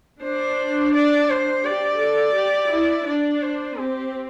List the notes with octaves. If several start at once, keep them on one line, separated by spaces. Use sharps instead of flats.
D4 C5
D5
C5
G4 D5
A4
G4
E4
D4 D5
C5
C4 G4